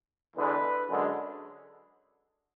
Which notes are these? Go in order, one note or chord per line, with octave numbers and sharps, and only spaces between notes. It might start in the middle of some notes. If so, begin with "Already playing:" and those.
E2 D3 G#3 B4
F#2 D3 G#3